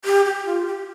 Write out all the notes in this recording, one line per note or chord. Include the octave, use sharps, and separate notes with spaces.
G4
G4
F4
G4